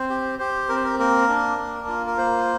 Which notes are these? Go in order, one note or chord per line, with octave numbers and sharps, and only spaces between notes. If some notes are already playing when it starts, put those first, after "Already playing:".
Already playing: C4 C5
G4
G4 C5
C4 A#4
C5
A#4
A#3 A#4
D4
A#3
F4
A#4
A#3 C5